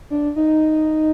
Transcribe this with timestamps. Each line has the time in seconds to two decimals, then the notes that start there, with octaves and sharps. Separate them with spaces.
0.10 D4
0.36 D#4